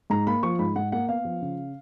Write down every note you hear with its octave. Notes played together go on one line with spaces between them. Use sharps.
G#2 A#5
A#3 B5
F3 C#6
G#2 B5
G#2 F#5
A#3 F#5
B3 F5
F3
C#3